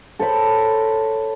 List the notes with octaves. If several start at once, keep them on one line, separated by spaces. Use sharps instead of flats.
A4 C5 C#5 B5